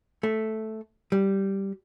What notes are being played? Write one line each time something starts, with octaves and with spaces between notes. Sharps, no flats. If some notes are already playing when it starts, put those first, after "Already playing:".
A3
G3